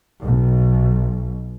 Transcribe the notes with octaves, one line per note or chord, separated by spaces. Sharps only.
B1